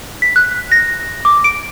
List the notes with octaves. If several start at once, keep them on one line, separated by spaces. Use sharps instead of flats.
B6
F#6
A#6
D6
D7